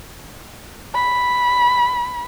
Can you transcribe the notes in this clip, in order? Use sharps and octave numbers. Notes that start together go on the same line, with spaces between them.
B5